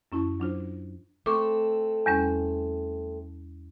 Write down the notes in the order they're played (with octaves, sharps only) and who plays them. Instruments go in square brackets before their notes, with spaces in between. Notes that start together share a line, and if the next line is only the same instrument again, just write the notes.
[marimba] F#2 C#4 E4 A5 C#6
F#3 D4 F4 C5
[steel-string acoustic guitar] A3 C4 A4 [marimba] C#6 D6
[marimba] E2 G3 C#4